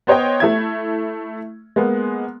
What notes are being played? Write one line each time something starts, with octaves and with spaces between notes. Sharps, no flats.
B3 C5 C#5 D#5 G5
A3 E4 E5 G#6
G#3 A#3 B3